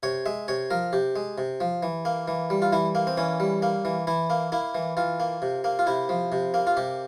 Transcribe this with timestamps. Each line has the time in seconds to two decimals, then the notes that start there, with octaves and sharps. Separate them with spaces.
0.03 C3 C#5
0.26 G#3 E5
0.48 C3 C#5
0.70 F3 A#4
0.93 C3 G4
1.16 G#3
1.38 C3
1.60 F3
1.83 E3
2.05 A#3
2.28 E3
2.50 G3
2.62 F4
2.72 E3 E4
2.95 A#3
3.07 C4
3.17 E3 C#4
3.40 G3
3.62 A#3
3.85 E3
4.07 E3 E4
4.30 A#3
4.52 A#3 E4
4.75 E3
4.97 E3 F4
5.20 A#3
5.42 C3
5.64 A#3
5.79 F4
5.87 C3 E4
6.09 F3
6.32 C3
6.54 A#3
6.67 F4
6.77 C3 G4